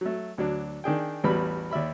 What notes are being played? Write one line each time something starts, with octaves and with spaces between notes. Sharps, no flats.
F#3 A3
D2 F#3 D4
D#3 D4 G#4 G5
A1 E2 G3 B3 F#4 B5
D#2 D5 E5 B5